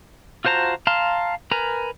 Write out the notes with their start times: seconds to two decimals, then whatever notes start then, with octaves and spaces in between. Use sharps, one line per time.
0.45 F4 F#4 C5 A5 A#5
0.87 F5 A5 A#5 C6 F6
1.51 A#4 B4 G#5 A#5